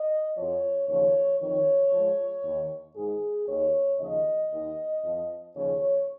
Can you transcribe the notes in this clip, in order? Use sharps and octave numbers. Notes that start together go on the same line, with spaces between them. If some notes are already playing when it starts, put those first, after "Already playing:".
Already playing: D#5
F2 F3 C#5
D#2 C#3 F3 C#5
F2 D#3 C#5
G#2 F3
D#2 D#3
G#2 D#3 G#4
D#2 D#3 C#5
D#2 C#3 F3 D#5
D#2 D#3
F2 F3
D#2 C#3 F3 C#5